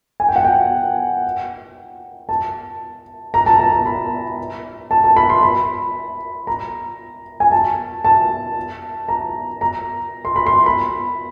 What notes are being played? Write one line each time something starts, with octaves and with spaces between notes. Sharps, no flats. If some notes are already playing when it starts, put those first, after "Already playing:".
G#5
G5
F#5
G5
A5
A#5
A5
A5
A#5
B5
A5
A5
B5
C6
B5
A#5
G#5
A5
A5
A#5
A#5
C6
B5
C6
B5